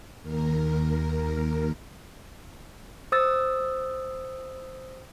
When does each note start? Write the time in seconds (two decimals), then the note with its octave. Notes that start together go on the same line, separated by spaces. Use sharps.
0.22 D#2 A#4
3.12 C5 D#6 E6 A6